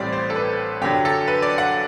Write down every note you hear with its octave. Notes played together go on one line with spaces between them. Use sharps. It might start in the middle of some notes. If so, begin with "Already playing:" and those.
Already playing: A1 A2 G3 C4 D5
C5
A4
B4
F#2 D3 F#3 G4
A4
B4
D5
F#5